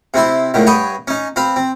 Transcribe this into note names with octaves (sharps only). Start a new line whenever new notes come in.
C3 C4 E4 C6
C#2 A2 D3 D#3
G2 B4 C#5 F#5 G5 D#6
C#4 D#4
C4 B4 F5 B5
C4